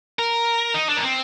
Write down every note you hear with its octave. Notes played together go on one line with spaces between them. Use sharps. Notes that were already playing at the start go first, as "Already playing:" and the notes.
A#4
D#4
D4
A#3
C4